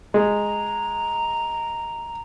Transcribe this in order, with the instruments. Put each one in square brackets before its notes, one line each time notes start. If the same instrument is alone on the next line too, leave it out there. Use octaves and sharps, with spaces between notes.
[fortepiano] G#3 [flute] A#5